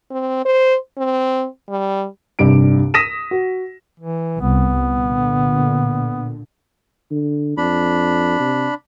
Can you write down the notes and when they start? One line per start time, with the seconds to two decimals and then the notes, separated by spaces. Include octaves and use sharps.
0.11 C4
0.45 C5
0.97 C4
1.69 G3
2.39 F1 C2 G2 G4 D7
2.94 D#6 A#6 B6 D#7 E7
3.31 F#4
4.00 E3
4.41 C2 B3
4.91 A#2 D3
7.11 D3
7.57 F2 D4 B5
8.40 C3